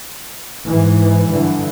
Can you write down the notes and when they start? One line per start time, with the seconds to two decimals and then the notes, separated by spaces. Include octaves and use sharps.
0.67 G#2 E3
1.30 G2 D3 E3